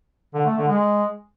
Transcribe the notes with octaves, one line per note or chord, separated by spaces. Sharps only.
D3
A3
D3
G#3